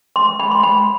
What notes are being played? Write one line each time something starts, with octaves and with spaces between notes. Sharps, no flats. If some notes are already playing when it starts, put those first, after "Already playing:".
C6
B5
C6
B5